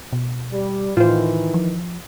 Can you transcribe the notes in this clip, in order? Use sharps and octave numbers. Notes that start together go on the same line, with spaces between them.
B2
G3
A2 D#3 E3 F4 C5
F3